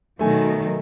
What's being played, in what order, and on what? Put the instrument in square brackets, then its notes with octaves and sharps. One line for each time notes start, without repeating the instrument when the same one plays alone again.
[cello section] B2 D#3 F#3 [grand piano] A3 G#5